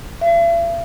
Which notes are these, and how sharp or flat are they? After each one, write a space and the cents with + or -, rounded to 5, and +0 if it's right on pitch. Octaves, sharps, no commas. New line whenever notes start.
E5 +45